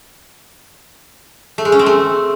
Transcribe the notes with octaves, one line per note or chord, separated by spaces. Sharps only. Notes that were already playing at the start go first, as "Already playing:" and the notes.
A3
G#3
C#4
C4
A3